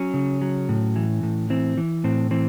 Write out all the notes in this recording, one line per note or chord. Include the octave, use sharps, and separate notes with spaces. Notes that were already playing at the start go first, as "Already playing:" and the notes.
Already playing: F#3 C#4
C#3
F#3
A2
E3
A2
E3 C4
E3
A2 C4
E3 C4